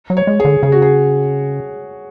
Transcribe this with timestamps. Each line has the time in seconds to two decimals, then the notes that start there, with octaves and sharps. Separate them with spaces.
0.10 F#3
0.17 C#5
0.27 G#3
0.40 G#4
0.45 D3
0.63 C#3 G#4
0.72 F#4
0.82 G#4